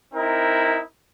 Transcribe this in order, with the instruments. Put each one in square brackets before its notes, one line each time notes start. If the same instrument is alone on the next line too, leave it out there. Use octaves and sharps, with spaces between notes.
[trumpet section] C4 D#4 E4 A#4